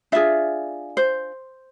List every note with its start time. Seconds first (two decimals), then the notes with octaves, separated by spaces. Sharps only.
0.12 D4 F4 G#4 E5
0.97 C5